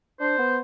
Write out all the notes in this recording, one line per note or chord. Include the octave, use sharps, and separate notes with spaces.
D4 C5
B3